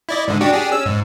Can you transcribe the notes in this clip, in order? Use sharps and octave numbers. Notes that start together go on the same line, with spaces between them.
E4 D5 D#5
G#2 D3
D4 F#4 G4
D4 G4 G#4
C#4 E6
G#2